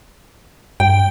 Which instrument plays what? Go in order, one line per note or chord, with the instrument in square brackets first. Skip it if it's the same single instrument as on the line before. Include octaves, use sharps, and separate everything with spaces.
[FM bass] G2 [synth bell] G5